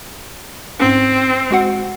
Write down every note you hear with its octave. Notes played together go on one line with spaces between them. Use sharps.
G#2 C4 C#4
G#3 F#4 F#5